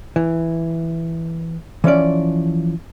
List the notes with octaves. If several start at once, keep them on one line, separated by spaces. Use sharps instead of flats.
E3
E3 F3 C#4 D5